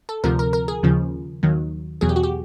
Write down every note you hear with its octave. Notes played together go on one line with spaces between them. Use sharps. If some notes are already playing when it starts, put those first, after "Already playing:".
A4
D2 C3 F3 A#4
A#4
A#4
G#4
D#2 C#3 F3
D#2 D#3 F#3
E2 B2 F#3 G#4
G4
F#4
G4